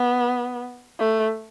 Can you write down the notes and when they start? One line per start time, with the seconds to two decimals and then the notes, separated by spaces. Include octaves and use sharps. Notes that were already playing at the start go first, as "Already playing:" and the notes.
Already playing: B3
0.99 A3